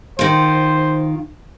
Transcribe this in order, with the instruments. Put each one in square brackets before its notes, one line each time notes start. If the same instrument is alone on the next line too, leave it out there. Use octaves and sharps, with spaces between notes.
[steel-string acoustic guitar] D#3 F4 [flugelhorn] C5